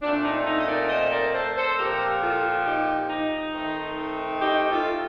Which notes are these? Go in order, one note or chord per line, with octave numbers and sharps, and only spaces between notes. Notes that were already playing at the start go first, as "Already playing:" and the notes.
A#2 A3 C4 D4
D#4
D#4
D#5
A#4 D5
C5 D#5
A#4 D5
A4 C5
A4 C5
A#2 F3 C4 G4 A#4
F4 A4
D#4 G4
D#4
D#3 A3 C4
D#4 G4
F4 A4